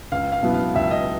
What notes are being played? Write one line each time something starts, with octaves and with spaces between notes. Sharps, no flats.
C#2 F5
F5
B2 F#3 B3 E4
F5
C#2 E5
D#5